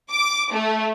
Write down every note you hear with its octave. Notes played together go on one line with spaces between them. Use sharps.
D6
A3